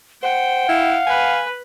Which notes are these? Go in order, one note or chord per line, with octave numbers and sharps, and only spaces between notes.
C5 F#5 G5
E4 F5
B4 G#5